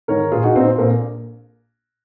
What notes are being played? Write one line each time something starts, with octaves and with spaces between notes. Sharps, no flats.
G#2 D#3 A#4 C#5
A#1 F4 G#4
D#4 F#4
A#2 C4 D#4
C4
A#1 A#3